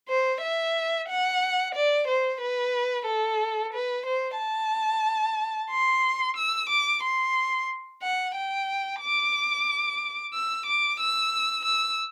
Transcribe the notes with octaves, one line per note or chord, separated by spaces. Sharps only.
C5
E5
F#5
D5
C5
B4
A4
B4
C5
A5
C6
E6
D6
C6
F#5
G5
D6
E6
D6
E6
E6